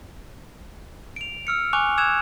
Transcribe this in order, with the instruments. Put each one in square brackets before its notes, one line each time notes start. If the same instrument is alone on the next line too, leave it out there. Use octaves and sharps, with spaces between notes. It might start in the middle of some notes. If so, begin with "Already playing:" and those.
[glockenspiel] D7 F7
E6 F6 C#7
G#5 C#6 D6 F#6 F7
D6 E6 F#6 G#6 E7 F7